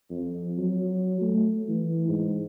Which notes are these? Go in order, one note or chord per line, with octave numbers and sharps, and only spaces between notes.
F2
F#3
A3
E3
G#2